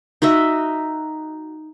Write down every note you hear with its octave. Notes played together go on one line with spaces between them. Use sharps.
D#4 F#4 D#5 E5